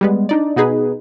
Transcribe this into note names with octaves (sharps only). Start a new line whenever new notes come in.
G3 G#3 B3
D4 D#4 D5
B2 B3 D#4 G#4 B4